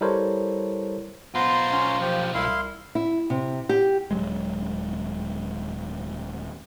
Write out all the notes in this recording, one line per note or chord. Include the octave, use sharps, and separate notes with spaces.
G3 E4 A4 A#4 C5 C#5
B1 B3 F4 C5 A#5 C6
C#4
F3 G4
C2 E4 F5 C6
E4
C3
G4
D#1 F#3 G#3